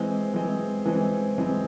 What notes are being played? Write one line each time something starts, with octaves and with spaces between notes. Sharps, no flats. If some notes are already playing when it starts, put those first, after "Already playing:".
Already playing: E3 G#3 C4
E3 G#3 C4
E3 G#3 C4
E3 G#3 C4